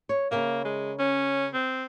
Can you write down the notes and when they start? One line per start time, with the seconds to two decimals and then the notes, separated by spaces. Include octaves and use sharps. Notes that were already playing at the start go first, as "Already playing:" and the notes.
0.09 C#5
0.32 C#3 A#3 A#4 E5
0.65 G#3
0.99 C#4
1.54 C4